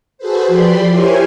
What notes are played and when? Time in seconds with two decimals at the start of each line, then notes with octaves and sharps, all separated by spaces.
0.18 F#4 G#4 A4 B4 C5
0.48 F3 G4 D5 B5 C6
0.90 E4 G4 A#4 C5 C#5 G#5